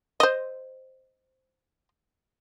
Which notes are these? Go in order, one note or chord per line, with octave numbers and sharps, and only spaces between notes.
C5 D#5